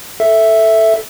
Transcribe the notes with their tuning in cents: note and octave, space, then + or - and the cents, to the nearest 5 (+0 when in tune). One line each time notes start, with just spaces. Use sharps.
A4 +0 E5 +0